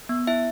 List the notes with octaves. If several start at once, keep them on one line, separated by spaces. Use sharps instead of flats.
B3
E4 E5